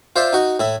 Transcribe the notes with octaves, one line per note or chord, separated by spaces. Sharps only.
F4 C5 D5 E5
D#4 F#4
A2 E4